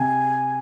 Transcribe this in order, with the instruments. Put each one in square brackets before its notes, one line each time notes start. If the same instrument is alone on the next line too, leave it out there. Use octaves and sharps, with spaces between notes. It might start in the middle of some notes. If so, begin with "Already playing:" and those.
Already playing: [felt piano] C3 [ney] G#5